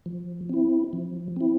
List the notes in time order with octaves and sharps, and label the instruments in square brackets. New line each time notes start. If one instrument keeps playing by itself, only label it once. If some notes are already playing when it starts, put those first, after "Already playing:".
[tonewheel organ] F3
C4 E4
F3
C4 E4